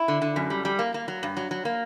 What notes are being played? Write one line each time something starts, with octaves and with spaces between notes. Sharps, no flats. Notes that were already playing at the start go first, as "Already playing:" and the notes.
Already playing: E4
D3
D3
F#2
G3
G3
A#3
A#3
F#3
G2
F#3
F#3
A#3